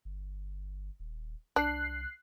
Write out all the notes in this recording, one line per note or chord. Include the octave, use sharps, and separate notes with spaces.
G1
D#1
C2 D4 F#6 C7